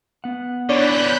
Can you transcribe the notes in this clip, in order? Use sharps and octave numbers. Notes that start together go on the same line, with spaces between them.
B3 F#5
D3 E3 D4 C#5 D5 B5 F#6 G6